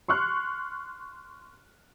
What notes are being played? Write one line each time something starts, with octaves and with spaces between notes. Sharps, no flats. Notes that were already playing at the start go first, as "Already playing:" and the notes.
C6 C#6 F6 F#6